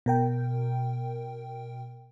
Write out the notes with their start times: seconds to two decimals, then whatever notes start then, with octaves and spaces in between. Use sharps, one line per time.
0.06 B2 A#4 G5